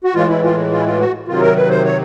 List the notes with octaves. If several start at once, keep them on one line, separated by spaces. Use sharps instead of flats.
F#4
A2 E3 G#3 F4
E4
F4
F4
E4
F4
F#4
C3 D#3 F#3 F4
A#4
B4
C5
C#5